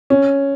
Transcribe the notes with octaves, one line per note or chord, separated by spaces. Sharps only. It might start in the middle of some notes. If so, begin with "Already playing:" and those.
C#4